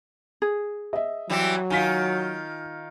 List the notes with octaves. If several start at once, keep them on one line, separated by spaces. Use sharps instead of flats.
G#4
D#5 E5
E3 F#3 G3 C4
D#3 F4 G#5 B6